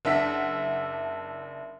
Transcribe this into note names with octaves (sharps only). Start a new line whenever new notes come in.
F#1 D4 E5 F#5 B6